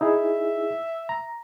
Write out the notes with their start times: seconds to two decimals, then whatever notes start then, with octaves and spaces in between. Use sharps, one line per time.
0.01 D#4 E4 G#4 E5
1.09 A#5